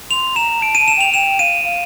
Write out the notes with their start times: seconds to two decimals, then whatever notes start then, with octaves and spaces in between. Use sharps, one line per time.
0.11 C6 F7
0.36 A#5 E7
0.62 A5 D7
0.75 A5 D#7
0.88 E7
0.97 G5 F7
1.14 G5 E7
1.39 F5 D#7
1.64 F5